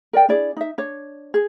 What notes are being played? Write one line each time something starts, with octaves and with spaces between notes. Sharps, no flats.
A#4 D5 G5
D4 E4 G#4 D5
D#4 E5
D4 C#5
G#4